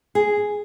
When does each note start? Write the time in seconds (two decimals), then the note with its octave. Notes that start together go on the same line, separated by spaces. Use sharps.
0.15 G#4